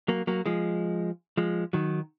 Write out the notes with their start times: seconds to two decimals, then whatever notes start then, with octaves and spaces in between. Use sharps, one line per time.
0.08 F#3 A#3
0.27 F#3 A#3
0.46 F3 G#3
1.37 F3 G#3
1.73 D#3 F#3